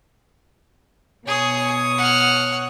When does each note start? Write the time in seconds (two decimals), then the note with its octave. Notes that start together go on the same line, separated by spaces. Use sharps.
1.27 B2 G#4 C#5 D#6
1.98 F#5 F6